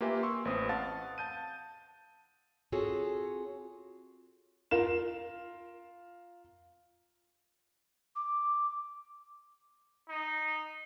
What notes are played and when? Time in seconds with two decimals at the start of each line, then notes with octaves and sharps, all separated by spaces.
0.01 A#3 F4 G4 B4 E5 G#5
0.23 C6 C#6 E6
0.45 A1 C4 B4 D#6
0.69 F5 F#5 A5 A6
1.18 A5 G6 D#7
2.72 C4 F4 F#4 G#4 A4 C#5
4.71 F4 A#4 E7
8.16 D6
10.09 D#4